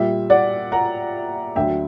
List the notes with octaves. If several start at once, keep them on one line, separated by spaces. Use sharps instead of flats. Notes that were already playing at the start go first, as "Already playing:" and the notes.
Already playing: A#2 G3 E5
D5 F#5
F#5 A#5
D2 D3 F#3 E5 G5